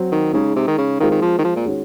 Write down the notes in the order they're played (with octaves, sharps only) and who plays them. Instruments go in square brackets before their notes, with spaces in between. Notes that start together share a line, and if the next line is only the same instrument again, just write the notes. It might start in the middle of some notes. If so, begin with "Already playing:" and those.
Already playing: [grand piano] F#3 C4 F#4
[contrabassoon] D#3
[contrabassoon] C#3 [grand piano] G#3 D#4 G#4
[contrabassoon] C3
D#3
C#3
[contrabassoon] D#3 [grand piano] G#3 C4 F4 A#4
[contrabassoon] D#3
F3
D#3
F3
A#2
[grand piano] D#3 G#3 C#4 F#4